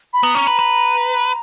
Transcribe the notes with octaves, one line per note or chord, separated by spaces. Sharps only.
B5
B3 A#5
C#4
B4
B4